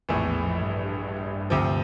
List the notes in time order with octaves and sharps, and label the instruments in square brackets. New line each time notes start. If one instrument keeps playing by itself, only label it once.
[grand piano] A#1 A2 E3 A3 [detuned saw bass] F2
[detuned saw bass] E2
F2
G2
[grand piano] D2 C3 F3